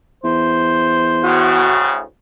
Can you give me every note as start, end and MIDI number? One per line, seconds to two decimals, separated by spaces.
0.24 1.71 40
0.24 1.50 72
1.24 2.02 38
1.24 2.02 45
1.24 2.02 49
1.24 1.92 66